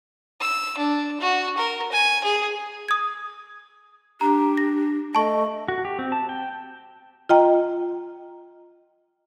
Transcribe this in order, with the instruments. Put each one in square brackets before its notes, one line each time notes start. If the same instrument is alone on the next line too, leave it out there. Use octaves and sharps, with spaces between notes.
[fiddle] E6
D4
F#4
A#4
G#5
G#4
[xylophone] D#6 G#6
[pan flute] D4 [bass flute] G4 [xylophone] A#5
[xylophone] A#6
[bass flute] A3 [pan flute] D#5 [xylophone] A5 C#6
[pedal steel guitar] F#4
G4
C4
A5
G5
[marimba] F4 D#5 G5 A#5